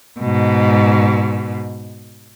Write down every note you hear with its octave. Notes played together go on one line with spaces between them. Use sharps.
G#2 B2